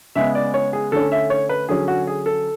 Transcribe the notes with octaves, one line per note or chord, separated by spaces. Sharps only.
C#3 G#3 B3 E5
D5
C#5
G#4
D3 A3 C#4 A4
E5
C#5
B4
D3 F#3 C#4 G#4
F#4
G#4
A4